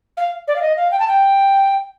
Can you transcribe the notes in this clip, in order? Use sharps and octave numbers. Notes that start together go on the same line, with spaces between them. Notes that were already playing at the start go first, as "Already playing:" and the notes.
F5
D5
F5
D#5
F5
G5
A5
G5